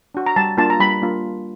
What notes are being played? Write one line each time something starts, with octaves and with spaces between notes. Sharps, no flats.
D4 F#4
A#5
G3 A5
A#3 D4 F4 A5
A#5
G3 B5
A#3 D4 F4